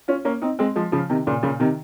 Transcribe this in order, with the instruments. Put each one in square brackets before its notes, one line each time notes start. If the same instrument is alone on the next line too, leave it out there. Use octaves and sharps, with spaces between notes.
[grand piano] C#4 F4
A#3 C#4
C4 D#4
G#3 C4
F3 G#3
C#3 F3
C3 D#3
A#2 C#3
A#2 C#3
C3 D#3